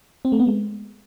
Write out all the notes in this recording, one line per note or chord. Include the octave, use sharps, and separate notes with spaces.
C4
A3
B3
G#3